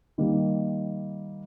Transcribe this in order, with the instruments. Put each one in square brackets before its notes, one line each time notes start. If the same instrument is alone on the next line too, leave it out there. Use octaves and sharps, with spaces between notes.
[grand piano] D#3 G3 A#3